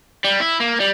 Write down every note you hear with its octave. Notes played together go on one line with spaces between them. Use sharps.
G3
E4
A#3
G3